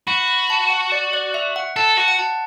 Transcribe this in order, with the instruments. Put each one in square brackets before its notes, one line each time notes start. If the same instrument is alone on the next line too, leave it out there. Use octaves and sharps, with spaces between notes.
[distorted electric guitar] F#4 [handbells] B5
[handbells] B5
A5
F#5
D5
D5
E5
F#5
[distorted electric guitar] A4 [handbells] A5
[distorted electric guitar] F#4 [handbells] F#5
[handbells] F#5
A5